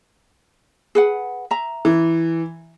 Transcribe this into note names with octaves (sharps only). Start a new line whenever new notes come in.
G#4 B4 F#5
E5 A#5
E3